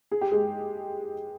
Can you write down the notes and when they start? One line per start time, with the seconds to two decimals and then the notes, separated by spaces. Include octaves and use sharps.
0.12 G#4
0.21 G4
0.31 G#3 G#4